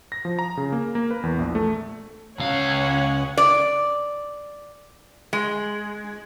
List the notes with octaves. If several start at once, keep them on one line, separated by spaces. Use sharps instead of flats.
A#6
F3
A#5
C#3
A#3
A#3
B4
E2
A#1
A3
C#2 C#4 F5 F#5
D5
G#3